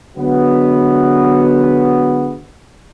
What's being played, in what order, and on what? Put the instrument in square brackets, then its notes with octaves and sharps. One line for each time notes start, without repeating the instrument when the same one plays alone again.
[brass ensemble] D3 F#3 G#3 B3